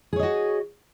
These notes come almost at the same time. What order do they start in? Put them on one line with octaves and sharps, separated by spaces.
G#4 C#5 D#5 F#4